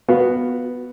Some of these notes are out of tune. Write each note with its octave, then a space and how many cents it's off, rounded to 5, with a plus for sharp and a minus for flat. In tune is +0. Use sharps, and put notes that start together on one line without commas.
B3 +0 F#4 +0 F5 +0